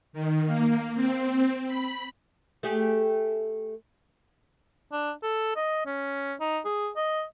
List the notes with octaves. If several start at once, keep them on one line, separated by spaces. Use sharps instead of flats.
D#3
A#3
C4
B5
A3 G4 G#4
D4
A4
D#5
C#4
D#4
G#4
D#5